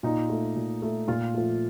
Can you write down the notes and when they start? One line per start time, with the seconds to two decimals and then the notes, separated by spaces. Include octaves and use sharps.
0.03 A#2 D#4
0.29 A3
0.56 A#2
0.82 A3
1.07 A#2 F4
1.34 F3 A3